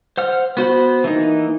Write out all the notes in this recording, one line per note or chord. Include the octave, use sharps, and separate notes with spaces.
C5 F#5 F6
B3 F#4 C5 B5
E3 A#3 D#4